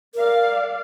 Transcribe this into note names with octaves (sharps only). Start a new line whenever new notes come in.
A#4 D5 F5